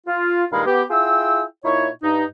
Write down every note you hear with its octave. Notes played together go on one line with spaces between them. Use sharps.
F4
G2 A#2 D#3 G#3 F5 B5
B3 G4
E4 F4 G#4 G5 E6
A#2 D#4 E4 C#5
G2 D#4